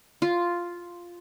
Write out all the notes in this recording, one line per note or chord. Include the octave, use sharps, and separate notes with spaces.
F4